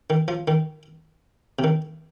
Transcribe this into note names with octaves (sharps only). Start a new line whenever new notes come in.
D#3
F3
D#3
C3
D#3